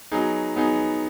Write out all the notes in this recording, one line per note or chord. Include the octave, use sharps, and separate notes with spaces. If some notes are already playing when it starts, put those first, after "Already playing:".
F#3 B3 D#4 G#4
F#3 B3 D#4 G#4